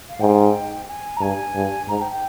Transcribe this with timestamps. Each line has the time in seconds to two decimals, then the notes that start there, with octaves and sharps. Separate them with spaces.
0.10 F5
0.20 G#2 G5
0.87 G#5
1.16 A#5
1.21 G2 G#5
1.55 G2
1.88 G#2 A#5
2.00 G5
2.10 G5